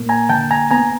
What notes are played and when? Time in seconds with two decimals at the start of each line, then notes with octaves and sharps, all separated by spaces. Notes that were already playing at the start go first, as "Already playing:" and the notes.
Already playing: A#2 A#3
0.09 G#5 A#5
0.29 D3 G5 A5
0.51 G#5 A#5
0.71 B3 G#5 A#5